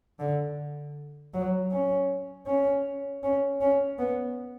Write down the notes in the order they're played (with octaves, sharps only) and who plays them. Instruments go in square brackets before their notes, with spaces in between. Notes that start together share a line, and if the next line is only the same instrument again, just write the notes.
[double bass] D3
F#3
C#4
C#4
C#4
C#4
B3